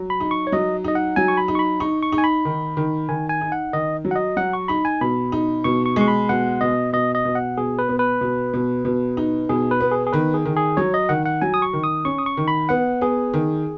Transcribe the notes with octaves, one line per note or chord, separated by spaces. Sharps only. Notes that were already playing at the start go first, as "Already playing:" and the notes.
Already playing: F#3
B5
D#4
C#6
C#5
F#3 D#5
D#4 D#5
F#5
F#3 G#5
C#6
B5
D#4
C#6
B5
D#4 C#6
C#6
D#4
G#5
B5
D#3
D#3
D#3 G#5
G#5
D#4
F#5
D#3 D#5
F#3
F#5
D#5
F#3 F#5
C#6
D#4 B5
G#5
B2 B5
D#4
B2 C#6
C#6
G#3 C#6
B5
B2 F#5
B2 D#5
B2 D#5
D#5
B2
F#5
B2 G#4
B4
B3
B4
B2
B2
B2
D#4
B2 G#4
B4
B3
G#4
G#4
D#3 B4
G#4
D#3
G#4
F#3 C#5
D#5
D#3 F#5
F#5
F#3 G#5
D#6
C#6
D#3
D#6
C#4 C#6
D#6
C#6
D#3
B5
B3 F#5
B3 G#4
D#3